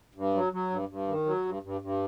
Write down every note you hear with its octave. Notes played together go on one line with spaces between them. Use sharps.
G2
F#3
F#3
G2
G2
D#3
F#3
G2
G2
G2